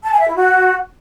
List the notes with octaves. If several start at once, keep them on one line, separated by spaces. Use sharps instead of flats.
A5
G#5
E5
E4
F#4